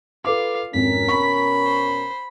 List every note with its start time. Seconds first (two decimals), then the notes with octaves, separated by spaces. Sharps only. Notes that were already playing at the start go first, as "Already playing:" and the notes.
0.25 F4 A4 B4 F5 D6
0.74 G#1 F2 B2 C#4 A#4 B6
1.08 B5 C#6
1.65 C5